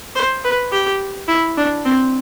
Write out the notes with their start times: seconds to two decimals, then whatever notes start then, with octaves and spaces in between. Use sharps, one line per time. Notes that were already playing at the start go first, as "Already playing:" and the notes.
0.16 C5
0.44 B4
0.72 G4
1.28 E4
1.57 D4
1.85 C4